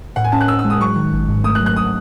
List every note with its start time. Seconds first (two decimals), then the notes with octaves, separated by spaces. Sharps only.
0.16 A2 F#5
0.24 G#5
0.32 C#4 A5
0.41 F#6
0.48 A2 E6
0.59 E6
0.65 G#3
0.70 D#6
0.81 F#3 C#6
0.96 D#3
1.13 G#1
1.29 G#2
1.44 A3 D#6
1.55 F#6
1.60 F#3
1.66 F#6
1.76 D#6